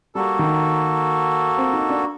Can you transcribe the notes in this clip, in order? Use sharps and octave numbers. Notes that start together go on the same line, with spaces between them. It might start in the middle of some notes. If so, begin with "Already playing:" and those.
G3 A#3 F#4 A4
D#3
C4
D#4
D4